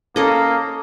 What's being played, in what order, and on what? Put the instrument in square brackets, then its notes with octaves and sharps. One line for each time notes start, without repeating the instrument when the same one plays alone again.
[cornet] A#3 [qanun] C#4 A4 D#5